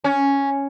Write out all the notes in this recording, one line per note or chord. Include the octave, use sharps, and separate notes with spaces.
C#4